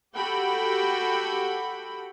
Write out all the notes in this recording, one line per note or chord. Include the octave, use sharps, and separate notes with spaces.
F#4 G4 A4 G5 B5